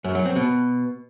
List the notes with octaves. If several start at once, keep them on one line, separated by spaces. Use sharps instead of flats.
F#2
F#3
C4
B2